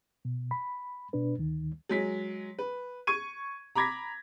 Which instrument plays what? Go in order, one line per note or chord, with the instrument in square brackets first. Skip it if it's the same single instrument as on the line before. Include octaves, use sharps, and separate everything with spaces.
[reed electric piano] B2
B5
B2 D4 B4
D2 D#3
[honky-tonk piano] F#3 G#3 B6
B4
C#6 G#6 D#7
A#5 B5 D6 G#6 A#6 B6